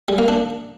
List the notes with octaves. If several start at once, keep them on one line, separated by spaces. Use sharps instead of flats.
G3
A#3
D4